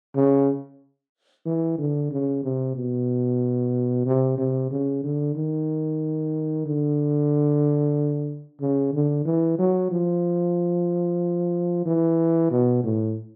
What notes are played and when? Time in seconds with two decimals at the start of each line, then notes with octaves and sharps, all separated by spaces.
0.15 C#3
1.46 E3
1.78 D3
2.11 C#3
2.43 C3
2.75 B2
4.06 C3
4.38 C3
4.71 C#3
5.04 D3
5.36 D#3
6.66 D3
8.61 C#3
8.94 D3
9.25 E3
9.59 F#3
9.91 F3
11.86 E3
12.51 B2
12.83 A2